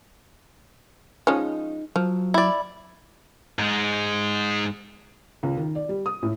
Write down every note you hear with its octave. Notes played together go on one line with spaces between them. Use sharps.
F3 G#3 C#4 D#4 D#5
F3 F#3
E4 D5
G#2 G#3
C#2
D#3
D5
G3
D#6
A2